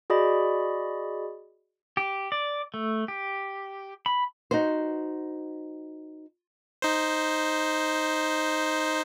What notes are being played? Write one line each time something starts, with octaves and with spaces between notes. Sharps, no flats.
F#4 G#4 D5 D#5 B5
G4
D5
A3
G4
B5
D#4 F#4 C5
D#4 C5